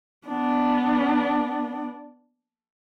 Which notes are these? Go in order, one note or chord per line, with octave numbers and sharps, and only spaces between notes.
B3 D4